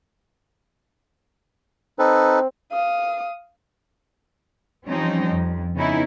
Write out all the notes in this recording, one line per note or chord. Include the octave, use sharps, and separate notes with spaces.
C4 D#4 A4 B4
F5 D#6
E3 F3 G3 C4 C#4 D#4
F2
C#3 B3 C#4 D#4 E4